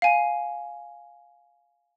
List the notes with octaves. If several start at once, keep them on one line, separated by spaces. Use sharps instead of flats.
F5 G#5